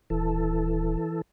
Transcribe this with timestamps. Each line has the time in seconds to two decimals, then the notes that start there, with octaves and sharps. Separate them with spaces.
0.10 D#1 E3 A4